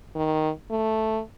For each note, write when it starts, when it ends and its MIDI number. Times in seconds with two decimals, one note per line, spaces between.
0.15 0.50 51
0.71 1.21 57